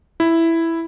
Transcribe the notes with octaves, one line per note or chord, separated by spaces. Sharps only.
E4